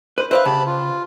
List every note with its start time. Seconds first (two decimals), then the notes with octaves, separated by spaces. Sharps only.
0.18 B4 C5
0.31 B4 C5 D5 E5 F5 F#6
0.45 C#3 G4 A5 B5
0.66 F4